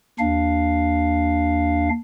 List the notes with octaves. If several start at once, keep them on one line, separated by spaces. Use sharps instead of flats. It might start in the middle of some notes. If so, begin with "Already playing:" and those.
D#2 D4 F5